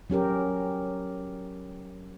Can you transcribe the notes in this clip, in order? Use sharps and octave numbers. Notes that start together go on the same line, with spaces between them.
F#3 C#4 G4 A#4